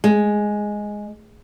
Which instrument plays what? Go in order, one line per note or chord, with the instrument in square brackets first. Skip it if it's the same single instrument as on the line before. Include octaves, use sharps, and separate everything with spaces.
[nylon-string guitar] G#3